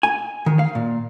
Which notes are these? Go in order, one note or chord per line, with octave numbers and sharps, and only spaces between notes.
G#5
D#3
F5
A#2